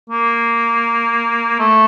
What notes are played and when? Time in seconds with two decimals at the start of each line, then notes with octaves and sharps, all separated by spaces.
0.10 A#3
1.59 A3